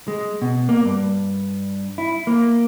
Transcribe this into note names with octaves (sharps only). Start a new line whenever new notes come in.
G#3
B2
A#3
G2
E4
A#3